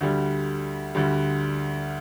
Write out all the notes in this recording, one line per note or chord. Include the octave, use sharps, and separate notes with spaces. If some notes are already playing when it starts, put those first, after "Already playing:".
D2 D3 G3
D2 D3 G3